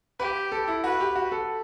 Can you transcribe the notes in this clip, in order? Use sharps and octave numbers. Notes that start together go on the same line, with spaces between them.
G4 B4
A4
E4
F#4 B4
G4
F#4
A4